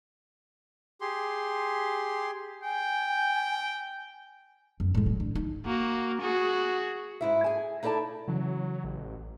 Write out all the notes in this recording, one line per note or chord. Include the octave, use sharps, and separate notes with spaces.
G4 G#4 C6
G5 G#5
F#2
A2 G#3
F#3
D3
D#4
A#3 F#4
F#4 G#4
G#2 E4 E5
G#4 G#5
D#4 E4 A4 D5 A5
C#3 E3 F#3
A1